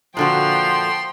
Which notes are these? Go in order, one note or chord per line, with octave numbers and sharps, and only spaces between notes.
A#2 D3 F3 F#4 G5 C6